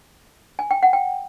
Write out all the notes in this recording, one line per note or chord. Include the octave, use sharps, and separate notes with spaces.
G#5
G5
F#5
G5